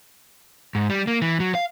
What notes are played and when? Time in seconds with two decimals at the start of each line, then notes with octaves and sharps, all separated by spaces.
0.75 G#2
0.90 G3
1.07 A#3
1.22 E3
1.40 F#3
1.55 F5